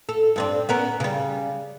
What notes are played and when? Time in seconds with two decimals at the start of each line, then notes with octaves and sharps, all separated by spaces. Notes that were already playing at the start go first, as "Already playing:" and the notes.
0.09 A4
0.36 G2 C4 D4
0.69 B3 C#4 A#4
1.00 C#3 G3